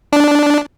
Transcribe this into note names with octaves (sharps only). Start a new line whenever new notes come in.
D4